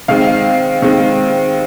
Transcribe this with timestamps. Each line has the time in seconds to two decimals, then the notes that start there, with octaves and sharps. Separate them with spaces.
0.08 D#3 G#3 C4 F5
0.82 D#3 G#3 C4